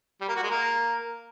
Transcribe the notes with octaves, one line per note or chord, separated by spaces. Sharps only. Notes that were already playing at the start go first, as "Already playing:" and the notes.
G3
A#3
F#4
G#3
A#3